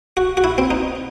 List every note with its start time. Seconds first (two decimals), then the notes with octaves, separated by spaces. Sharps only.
0.17 F#4
0.37 F#4
0.44 E4
0.58 C4
0.71 D#4